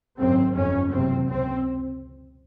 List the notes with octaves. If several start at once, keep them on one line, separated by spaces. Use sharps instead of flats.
G#1 F#2 C#3 C4
G1 F2 C#3 C#4
F#1 E2 C3 C4
C#2 B2 C4